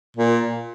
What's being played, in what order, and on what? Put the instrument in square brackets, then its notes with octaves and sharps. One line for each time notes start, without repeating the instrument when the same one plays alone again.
[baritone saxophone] A#2